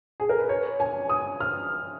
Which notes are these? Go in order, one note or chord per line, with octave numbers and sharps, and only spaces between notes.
G#4
A#4
B4
C#5
G#5
D#6
F6